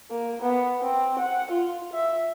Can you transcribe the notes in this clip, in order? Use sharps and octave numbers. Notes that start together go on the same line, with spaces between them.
A#3
B3
C4
F#5
F4
E5